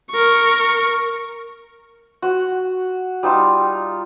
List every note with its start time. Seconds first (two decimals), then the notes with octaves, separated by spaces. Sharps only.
0.10 A#4 C#6
2.22 F#4
3.23 G3 D#4 F4 E6